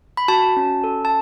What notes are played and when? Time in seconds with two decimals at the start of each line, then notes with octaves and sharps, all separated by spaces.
0.17 B5
0.28 F#4 A5
0.57 C#4
0.84 A4
1.05 A5